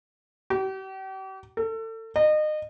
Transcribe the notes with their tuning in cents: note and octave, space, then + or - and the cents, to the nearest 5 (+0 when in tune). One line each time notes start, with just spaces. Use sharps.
G4 -40
A4 +30
D#5 -30